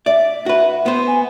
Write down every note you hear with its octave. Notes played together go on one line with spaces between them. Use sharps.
D5 E5
F#4 B4
B3 C5
G#5